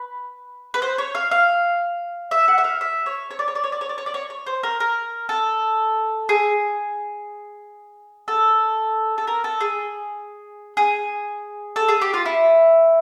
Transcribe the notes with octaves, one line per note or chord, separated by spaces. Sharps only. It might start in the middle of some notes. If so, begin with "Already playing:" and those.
Already playing: B4
B4
C5
C#5
F5
F5
E5
F#5
E5
F5
E5
C#5
C#5
D5
C#5
D5
C#5
D5
C#5
D5
C#5
D5
C#5
C#5
C5
A#4
A#4
A4
G#4
A4
A4
A#4
A4
G#4
G#4
A4
G#4
G4
F4
E4